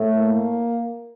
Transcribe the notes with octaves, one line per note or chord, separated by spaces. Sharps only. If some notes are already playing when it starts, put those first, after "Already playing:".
Already playing: A2 A3
A#3